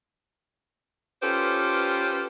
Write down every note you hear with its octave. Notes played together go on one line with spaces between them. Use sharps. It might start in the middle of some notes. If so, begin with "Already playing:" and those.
C#4 F4 G4 A4 B4 C5